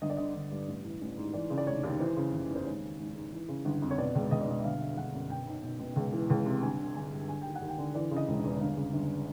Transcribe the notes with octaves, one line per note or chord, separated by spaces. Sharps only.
G1 D#5
D5
D3 D#5
G1
G2
A1
E3
A1
G#2
E3 D5
C#3
D5
F1 C#5
D#2
E3 C5
C#3
F#1
E2
C5
G#1 C#5
D#3
G#1
G#2
E3
C#3
G1
F2
C#5
B2 D5
C#2
C#2 D#5
D5
B2 D#5
E5
G1 F5
D3 E5
F5
G1 F#5
F#2
B2 G5
B1
B1
B2
C#2
E3
C#2
C3
G1 G#5
D3
G1 G#5
G2
D3 G#5
D#2 G5
F#5
D#2
G5
D3
E3 D5
C#3
D#5
E1
E2
G1 F5
C#3
G1